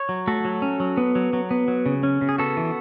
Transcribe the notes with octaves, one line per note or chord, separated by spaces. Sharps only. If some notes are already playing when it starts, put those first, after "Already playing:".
Already playing: C#5
F#3
A3 F#4 A4
F#3
C#4
F#3
B3
F#3
F#3
B3
F#3
C#3
C#4
C#3
G#4
B3 F#4 A4
E3